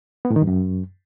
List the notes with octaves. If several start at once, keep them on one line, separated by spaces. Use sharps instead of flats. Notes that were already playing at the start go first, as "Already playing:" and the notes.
B3
A2
D#3
G2
F#2